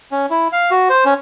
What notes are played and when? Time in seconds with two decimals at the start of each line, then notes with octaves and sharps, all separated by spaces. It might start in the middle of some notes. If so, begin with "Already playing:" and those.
0.12 C#4
0.30 E4
0.52 F5
0.71 F#4
0.90 C5
1.05 C#4